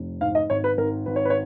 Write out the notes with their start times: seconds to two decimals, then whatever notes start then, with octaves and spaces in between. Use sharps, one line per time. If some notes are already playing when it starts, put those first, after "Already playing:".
Already playing: F1
0.21 G#2 F5
0.35 D#5
0.50 G#1 C#5
0.64 B4
0.78 G#1 A#4
1.06 G#1 B4
1.16 C#5
1.25 B4
1.30 C#5